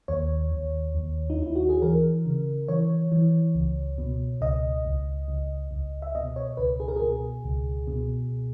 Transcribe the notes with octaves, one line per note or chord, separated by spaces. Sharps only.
D#2 C#5
D#2
D#2
D#4
D#2 E4
F#4
G#4
E3 A#4
C#3
E3 C#5
E3
C#2
B2
C#2 D#5
C#2
C#2
C#2
E5
B2 D#5
C#5
C#2 B4
G#4
A#4
G#4
B2
C#2
B2